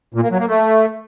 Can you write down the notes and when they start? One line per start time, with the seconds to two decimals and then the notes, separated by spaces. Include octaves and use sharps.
0.14 A#2
0.23 A#3
0.31 F#3
0.39 A#3
0.47 A3